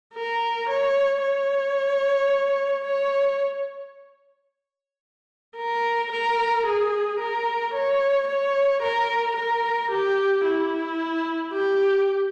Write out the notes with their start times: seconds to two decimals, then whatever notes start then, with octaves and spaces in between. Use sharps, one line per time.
0.15 A#4
0.69 C#5
1.23 C#5
2.86 C#5
5.57 A#4
6.12 A#4
6.66 G#4
7.20 A#4
7.74 C#5
8.28 C#5
8.82 A#4
9.36 A#4
9.91 G4
10.45 E4
11.53 G4